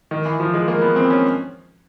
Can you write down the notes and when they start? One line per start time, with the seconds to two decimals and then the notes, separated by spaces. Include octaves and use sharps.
0.11 D#3
0.25 E3
0.40 F3
0.54 G#3
0.68 A#3
0.81 B3
0.96 C4
1.10 C#4